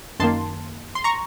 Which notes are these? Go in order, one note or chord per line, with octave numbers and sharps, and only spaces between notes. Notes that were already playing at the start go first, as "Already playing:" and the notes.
F#2 D#3 A#3 A5 C6
C6
A#5 C#6